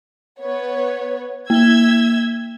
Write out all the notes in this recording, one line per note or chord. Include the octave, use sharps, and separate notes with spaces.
B3 C#5
A#3 E5 E6 G#6 G7